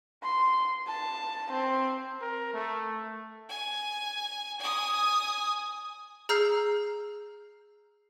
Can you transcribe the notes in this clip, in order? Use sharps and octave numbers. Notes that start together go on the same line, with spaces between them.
C6
A5
C4
A#4
A3
G#5
G#5 D#6
G#4 A#5 E6 F6 G6 C7